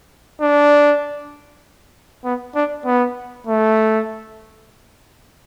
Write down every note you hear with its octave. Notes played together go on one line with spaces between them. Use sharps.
D4
B3
D4
B3
A3